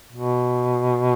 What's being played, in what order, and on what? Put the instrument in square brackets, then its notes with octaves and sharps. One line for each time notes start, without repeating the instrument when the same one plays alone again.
[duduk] B2